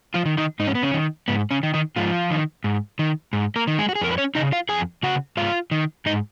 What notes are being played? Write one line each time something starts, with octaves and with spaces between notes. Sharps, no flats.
F3 F4
D#3
D#3 D#4
G#2 D#4
C#4
B3
C#3 C#4
D#3
G#2 B3
C#3 C#4
D#3
D#3 D#4
G#2 F3 F4
D#3
G#2
D#3
G#2
A#3 A#4
D#3
G#3 G#4
F#4
G#4
F2 A#4
B4
C#4 C#5
C#3 D#4 D#5
F4 F5
F2 G#4 G#5
C#3 F#4 F#5
G#2 F4 F5
D#3
G#2 D#4 D#5